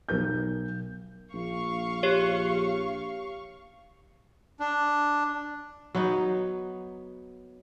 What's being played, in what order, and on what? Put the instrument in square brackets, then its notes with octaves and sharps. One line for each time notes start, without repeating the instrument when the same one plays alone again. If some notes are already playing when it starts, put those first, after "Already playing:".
[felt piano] B1 A#4 G6
[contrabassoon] A#1 [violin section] F5 C#6
[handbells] G4 C#5
[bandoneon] D4
[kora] F#3 B3 D#4